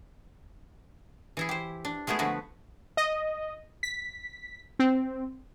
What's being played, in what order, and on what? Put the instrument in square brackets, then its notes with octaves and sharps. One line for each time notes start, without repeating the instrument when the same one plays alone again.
[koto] E3 E4 G#4
G4 C5
D4
G#3 A3 B3 E4 G#4
D3 F3 A3 F#4 B4
[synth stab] D#5
B6
C4